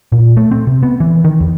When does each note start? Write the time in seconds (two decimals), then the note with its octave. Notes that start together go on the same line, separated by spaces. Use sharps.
0.12 A#2
0.37 A3
0.51 C4
0.67 C3
0.83 B3
1.00 E3
1.24 D#3
1.40 E2